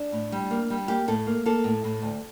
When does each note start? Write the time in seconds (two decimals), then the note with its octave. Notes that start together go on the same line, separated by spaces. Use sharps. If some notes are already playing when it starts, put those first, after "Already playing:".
Already playing: D4
0.12 A2
0.32 G3
0.51 A#3
0.70 G3
0.88 A#3 G4
1.08 A2 A4
1.27 A#3
1.46 A#3 A4
1.64 A2
1.84 A2
2.02 D2